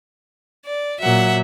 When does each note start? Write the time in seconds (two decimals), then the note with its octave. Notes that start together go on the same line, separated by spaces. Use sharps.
0.65 D5
1.00 A#2 F#3 E5 F#5